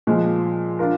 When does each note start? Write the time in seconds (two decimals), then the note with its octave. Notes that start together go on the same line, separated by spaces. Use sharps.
0.07 A#2 F3 G#3
0.79 D4 F4 A#4